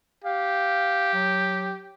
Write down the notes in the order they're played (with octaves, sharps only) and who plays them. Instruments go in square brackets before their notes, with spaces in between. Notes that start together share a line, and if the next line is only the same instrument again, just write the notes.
[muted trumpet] G4 [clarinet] F5
[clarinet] F#3